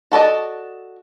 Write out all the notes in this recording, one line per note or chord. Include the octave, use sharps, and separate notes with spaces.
F#4 A4 D5 D#5